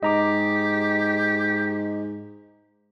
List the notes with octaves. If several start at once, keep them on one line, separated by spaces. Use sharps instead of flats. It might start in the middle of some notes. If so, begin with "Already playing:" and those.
G#2 G4 D#5 A#5 D6